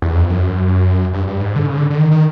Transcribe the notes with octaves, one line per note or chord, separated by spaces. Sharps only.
E2
F2
F#2
G2
G2
G#2
D3
C#3
D3
D3
D#3
D#3